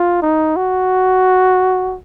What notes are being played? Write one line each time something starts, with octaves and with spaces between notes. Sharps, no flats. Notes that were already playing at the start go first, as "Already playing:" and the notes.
Already playing: F4
D#4
F#4